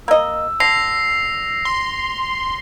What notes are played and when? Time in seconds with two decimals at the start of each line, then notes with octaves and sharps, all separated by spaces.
0.08 A#3 D#5 E6
0.60 D3 A#6 C7 F7
1.65 C6